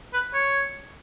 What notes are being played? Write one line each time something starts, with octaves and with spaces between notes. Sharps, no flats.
B4
C#5